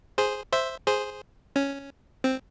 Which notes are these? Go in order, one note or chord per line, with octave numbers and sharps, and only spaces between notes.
G#4 C5
C5 E5
G#4 C5
C#4
C4